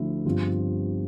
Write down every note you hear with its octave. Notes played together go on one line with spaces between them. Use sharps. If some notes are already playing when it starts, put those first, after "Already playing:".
Already playing: D2 D3 F3 A3 E4
G1 G2 F3 C4 F4